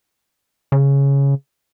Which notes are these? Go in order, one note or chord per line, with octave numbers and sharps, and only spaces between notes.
C#3